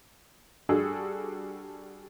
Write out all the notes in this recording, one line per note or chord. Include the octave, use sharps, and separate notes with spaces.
G3 D4 F#4 G#4 A4